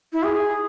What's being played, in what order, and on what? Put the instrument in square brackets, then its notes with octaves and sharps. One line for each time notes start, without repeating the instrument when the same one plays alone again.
[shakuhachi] E4
G#4